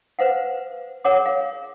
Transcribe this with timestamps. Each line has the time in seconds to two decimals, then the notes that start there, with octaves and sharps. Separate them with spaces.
0.19 B4 C5 F5 F#5
1.05 G#4 A#4 C#5 F#5 D6
1.26 F5